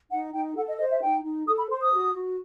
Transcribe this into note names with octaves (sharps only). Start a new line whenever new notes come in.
D#4 F#5
D#4 G5
A4 F#5
D#5
C5 D#5
E5
D#4 G5
D#4
A4 D#6
B5
C5 C6
D#6
F#4
F#4